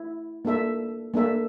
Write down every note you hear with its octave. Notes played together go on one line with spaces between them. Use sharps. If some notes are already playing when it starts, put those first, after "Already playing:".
Already playing: E4
A#3 D4 A4 E5
A#3 D4 A4 E5